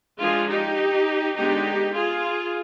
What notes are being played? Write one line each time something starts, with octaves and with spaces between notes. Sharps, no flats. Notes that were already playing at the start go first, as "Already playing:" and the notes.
F3 G#3 D4 F4 G#4
D#4 G4
D3 G#3 B3 D4 D#4 G4
F4 G#4